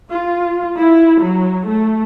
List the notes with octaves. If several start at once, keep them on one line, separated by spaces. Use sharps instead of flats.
F4
E4
F#3
A3